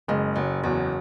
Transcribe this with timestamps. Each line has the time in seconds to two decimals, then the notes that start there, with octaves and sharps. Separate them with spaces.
0.08 F#1 G#3
0.36 F#1 F#3
0.64 E2 F#3